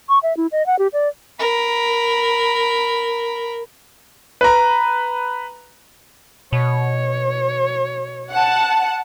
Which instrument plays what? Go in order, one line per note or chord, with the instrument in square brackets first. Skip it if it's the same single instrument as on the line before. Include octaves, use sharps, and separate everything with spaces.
[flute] C#6
E5
E4
D#5
F#5
G4
D5
[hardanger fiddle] A#4 B5
[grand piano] B4 A#5
[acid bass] B2 [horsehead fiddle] C#5
[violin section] F#5 A5